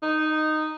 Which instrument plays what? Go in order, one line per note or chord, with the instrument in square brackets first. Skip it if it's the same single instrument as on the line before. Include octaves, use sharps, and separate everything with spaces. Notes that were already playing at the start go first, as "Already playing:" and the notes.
[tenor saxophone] D#4